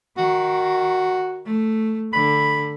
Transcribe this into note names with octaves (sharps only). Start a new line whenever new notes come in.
D#3 F#4
A3
D3 B5